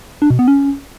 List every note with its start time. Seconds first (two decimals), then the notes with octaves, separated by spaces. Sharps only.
0.22 D4
0.30 B2
0.39 B3
0.48 C#4